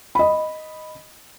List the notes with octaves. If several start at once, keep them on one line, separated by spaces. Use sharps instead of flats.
D#5 B5